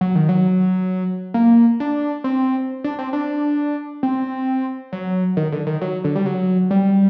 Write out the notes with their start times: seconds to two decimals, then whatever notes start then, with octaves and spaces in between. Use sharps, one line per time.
0.01 F#3
0.15 D#3
0.29 F#3
1.34 A#3
1.80 D4
2.24 C4
2.84 D4
2.99 C4
3.13 D4
4.03 C4
4.92 F#3
5.37 D#3
5.52 D3
5.67 D#3
5.81 F#3
6.04 D3
6.15 G3
6.26 F#3
6.71 G3